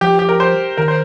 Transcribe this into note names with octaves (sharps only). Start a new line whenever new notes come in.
F3 G4
G4
A#4
C5
D#3 A#4
C5